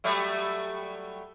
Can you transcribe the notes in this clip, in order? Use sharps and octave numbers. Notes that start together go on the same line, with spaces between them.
F#3 G3 A3